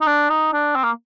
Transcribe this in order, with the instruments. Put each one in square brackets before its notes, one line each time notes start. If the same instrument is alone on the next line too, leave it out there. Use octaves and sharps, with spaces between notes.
[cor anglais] D#4
D4
D#4
D4
C4
A#3